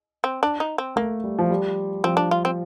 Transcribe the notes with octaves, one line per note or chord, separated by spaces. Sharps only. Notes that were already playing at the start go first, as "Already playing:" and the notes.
C4
D4
D#4
C4
A3 A#3
G3
F3
G3
F3 C4
D4
F4
C4